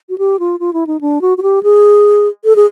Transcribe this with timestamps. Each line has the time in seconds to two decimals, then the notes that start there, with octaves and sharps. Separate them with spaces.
0.09 F#4
0.18 G4
0.39 F4
0.60 F4
0.73 E4
0.87 D#4
1.01 D4
1.21 F#4
1.38 F#4
1.43 G4
1.63 G#4
2.45 A4
2.56 G#4